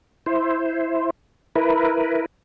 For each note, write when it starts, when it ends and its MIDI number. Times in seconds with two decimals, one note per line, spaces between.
0.26 1.10 64
0.26 1.10 72
1.56 2.26 64
1.56 2.26 70
1.56 2.26 71